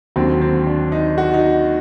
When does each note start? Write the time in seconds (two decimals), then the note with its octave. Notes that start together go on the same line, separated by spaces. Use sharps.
0.16 D#2 D3 F#3 C4
0.42 C4
0.67 D4
0.92 D#4
1.18 F#4
1.34 D#4